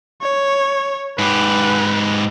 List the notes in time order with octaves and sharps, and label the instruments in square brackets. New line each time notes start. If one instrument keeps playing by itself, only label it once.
[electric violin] C#5
[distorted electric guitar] G#2 G4 [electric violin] B4